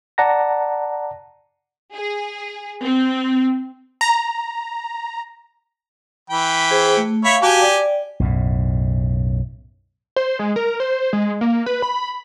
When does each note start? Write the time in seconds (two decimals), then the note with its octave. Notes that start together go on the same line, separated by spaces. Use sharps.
0.18 D5 F#5 A5 A#5 A#6
1.94 G#4
2.83 C4
4.01 A#5
6.30 E3 G5 B5
6.71 G#4 C5
6.97 A3
7.25 C#5 E5 F5 B5
7.42 F#4 G4 F5 G#5 A5 D6
7.61 D5 G5
8.20 B1 F#2 A2
10.16 C5
10.39 G#3
10.56 A#4
10.80 C5
11.13 G#3
11.41 A#3
11.66 B4
11.82 B5